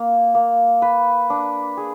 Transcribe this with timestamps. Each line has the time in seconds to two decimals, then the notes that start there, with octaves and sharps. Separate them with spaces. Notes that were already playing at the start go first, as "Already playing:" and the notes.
Already playing: A#3
0.35 A#3
0.82 B4
1.30 D4
1.77 G#4